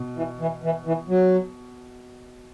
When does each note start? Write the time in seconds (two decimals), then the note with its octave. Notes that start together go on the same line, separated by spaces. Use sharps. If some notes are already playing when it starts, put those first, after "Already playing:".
Already playing: B2
0.16 E3
0.40 E3
0.63 E3
0.86 E3
1.09 F#3